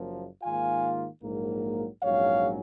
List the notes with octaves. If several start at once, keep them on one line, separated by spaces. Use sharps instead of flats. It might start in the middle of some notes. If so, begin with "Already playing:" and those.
Already playing: F#1 F#2 F3 A#3
G#2 D#3 A#3 F4 F5 G#5
A#1 G#2 F#3 A#3
A#1 G#2 F#3 C#4 C#5 F5